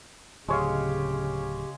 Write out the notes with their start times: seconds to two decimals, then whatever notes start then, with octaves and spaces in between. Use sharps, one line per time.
0.48 D1 C#3 G#3 G4 C#5 F5